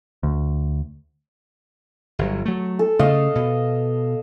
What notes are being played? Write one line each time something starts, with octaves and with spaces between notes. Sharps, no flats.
D2
G1 F#3
F#3 A3
A4
C#3 A3 D#5 F5
B2